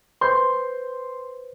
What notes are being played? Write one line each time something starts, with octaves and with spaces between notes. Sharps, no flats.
B4 C5 C6 G6